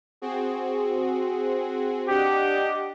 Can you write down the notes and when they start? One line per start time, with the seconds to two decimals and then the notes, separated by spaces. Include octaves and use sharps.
0.22 C4 F#4 G#4
2.09 D4 G4 D#5 F#5